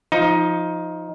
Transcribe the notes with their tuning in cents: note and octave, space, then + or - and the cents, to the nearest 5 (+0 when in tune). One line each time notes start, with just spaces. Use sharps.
F3 +0 D#4 +15